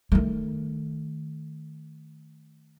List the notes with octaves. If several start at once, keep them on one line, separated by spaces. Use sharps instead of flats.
D#3 A3